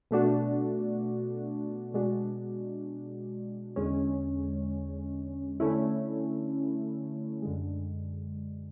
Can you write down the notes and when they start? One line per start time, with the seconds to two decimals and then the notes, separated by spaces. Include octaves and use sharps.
0.11 B2 A3 D4 F#4
1.94 B2 G#3 D4 F#4
3.76 E2 D3 G#3 C#4
5.60 D3 A3 C#4 E4
7.42 F#2 D3 G#3